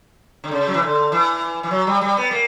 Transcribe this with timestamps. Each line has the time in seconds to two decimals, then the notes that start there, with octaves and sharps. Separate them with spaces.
0.44 D3
0.51 C#3
0.67 F#3
0.74 E3
0.82 D3
1.12 E3
1.63 E3
1.71 F#3
1.87 G3
2.01 G3
2.17 B3
2.31 A#3